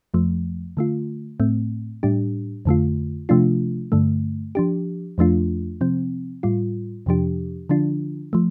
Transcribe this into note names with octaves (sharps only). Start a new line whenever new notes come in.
F2 F3 A3
D3 A3 F4
A2 A3 C4
A2 G3 D4 G4
F2 D3 A3 F4
C3 F3 A3 D4 F4
G2 D3 A3
F3 D4 G4
F2 F3 A3 D4 F4
C3 F3 C4
A2 G3 F4
F2 C3 F3 D4 G4
D3 F3 D4 F4
F3 A3